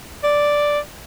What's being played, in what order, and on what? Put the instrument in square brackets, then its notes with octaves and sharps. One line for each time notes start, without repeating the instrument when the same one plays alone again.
[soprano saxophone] D5